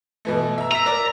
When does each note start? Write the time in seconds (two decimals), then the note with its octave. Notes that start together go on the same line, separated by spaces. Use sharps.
0.25 B2 E3 A3
0.58 E5 A#5
0.72 A#5 E6 B6
0.86 A#4 D5